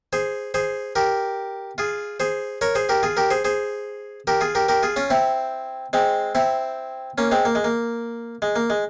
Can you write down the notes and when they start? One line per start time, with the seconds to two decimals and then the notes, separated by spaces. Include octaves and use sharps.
0.13 G#4 C5
0.54 G#4 C5
0.96 G4 A#4
1.78 F4 G#4
2.20 G#4 C5
2.61 A#4 C#5
2.75 G#4 C5
2.89 G4 A#4
3.03 F4 G#4
3.17 G4 A#4
3.31 G#4 C5
3.45 G#4 C5
4.27 G4 A#4
4.41 F4 G#4
4.55 G4 A#4
4.68 G4 A#4
4.83 F4 G#4
4.96 C#4 F4
5.10 C4 E4
5.93 G#3 C4
6.35 C4 E4
7.18 A#3 C#4
7.31 G#3 C4
7.45 A#3
7.55 G#3
7.64 A#3
8.42 G#3
8.56 A#3
8.70 G#3